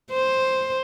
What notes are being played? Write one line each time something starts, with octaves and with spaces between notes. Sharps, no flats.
C5